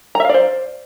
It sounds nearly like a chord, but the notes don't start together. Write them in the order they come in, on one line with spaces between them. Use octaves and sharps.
A#5 E5 F5 D5 C5